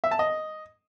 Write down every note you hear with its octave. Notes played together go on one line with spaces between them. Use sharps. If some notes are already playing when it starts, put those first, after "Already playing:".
E5
A5
D#5